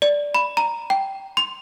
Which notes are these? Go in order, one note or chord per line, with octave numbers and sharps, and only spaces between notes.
D5
B5
A#5
G5
C6